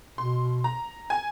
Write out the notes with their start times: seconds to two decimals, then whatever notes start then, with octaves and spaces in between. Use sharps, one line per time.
0.18 B2 C6
0.64 A#5
1.10 G#5